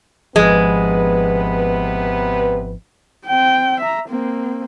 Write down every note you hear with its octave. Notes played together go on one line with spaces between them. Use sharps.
G#1 C3 F3 G#3 B3 B4
C4 G5
E5 A#5
A#3 C4